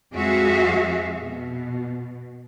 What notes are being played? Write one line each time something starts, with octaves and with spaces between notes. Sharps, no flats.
F2 G#3 F#4 G#4 E5 F5
B2